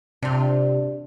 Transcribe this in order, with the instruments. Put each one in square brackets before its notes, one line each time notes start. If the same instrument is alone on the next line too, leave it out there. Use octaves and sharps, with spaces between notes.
[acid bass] C3 [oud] D4 F4